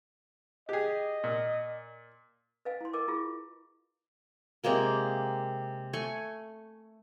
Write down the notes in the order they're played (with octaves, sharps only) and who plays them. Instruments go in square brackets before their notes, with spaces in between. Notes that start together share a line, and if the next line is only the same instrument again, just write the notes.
[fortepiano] G4 G#4 [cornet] D#5
[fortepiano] A#2
[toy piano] B4 D#5 F5 G#5
E4 C6
A#4 D#5 G#5 D6
E4 F4 G#4
[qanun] C3 G#3 A#3 A#4
A3 G#5 C#6